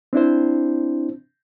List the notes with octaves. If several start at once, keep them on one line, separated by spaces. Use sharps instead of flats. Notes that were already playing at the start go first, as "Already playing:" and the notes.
C4 D4 E4 C5